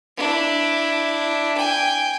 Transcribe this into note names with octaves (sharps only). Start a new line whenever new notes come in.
D4 E4
G5 G#5